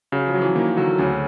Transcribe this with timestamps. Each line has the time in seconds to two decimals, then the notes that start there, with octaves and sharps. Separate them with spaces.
0.12 C#3 F#3
0.27 F3
0.34 F#3
0.41 E3
0.55 D#3 A#3
0.77 D3 F#3
0.98 D2 C#3